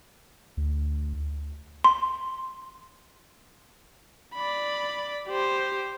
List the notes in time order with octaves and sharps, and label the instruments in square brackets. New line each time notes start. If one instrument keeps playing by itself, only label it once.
[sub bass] D2
[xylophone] C6
[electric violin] D5 B5
G4 C5